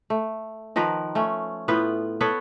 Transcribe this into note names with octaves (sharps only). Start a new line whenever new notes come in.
A3
D#3 F3 A#4 B4
A3 C#4
A2 B3 F4 B4
B3 A4 B4 C#5